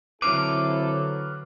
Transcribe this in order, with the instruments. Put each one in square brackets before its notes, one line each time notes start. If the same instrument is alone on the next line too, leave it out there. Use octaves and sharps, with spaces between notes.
[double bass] D3 F#3 [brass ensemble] C4 E4 A4 [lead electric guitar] B4 F5 [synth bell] D6